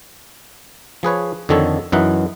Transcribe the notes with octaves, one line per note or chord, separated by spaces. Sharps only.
F3 G#4 B4 C#5
F2 D3 D#3 A4 C#5
F#2 E3 D#4 F#5